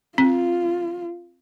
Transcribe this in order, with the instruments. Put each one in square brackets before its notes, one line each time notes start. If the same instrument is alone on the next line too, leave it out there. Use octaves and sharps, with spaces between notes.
[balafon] C4 [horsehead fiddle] F4